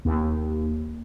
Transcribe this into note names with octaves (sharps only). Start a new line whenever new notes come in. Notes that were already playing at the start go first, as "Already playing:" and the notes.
D#2